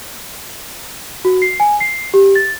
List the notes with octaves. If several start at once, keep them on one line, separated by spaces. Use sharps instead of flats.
F#4
C7
G#5
C7
G4
A6